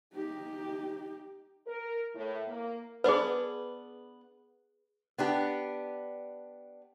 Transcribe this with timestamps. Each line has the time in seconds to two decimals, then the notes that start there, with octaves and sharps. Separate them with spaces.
0.14 D#4 G4
1.67 A#4
2.15 A2
2.47 A#3
3.04 B3 D4 G#4 B4 G#5
5.18 B3 D4 G4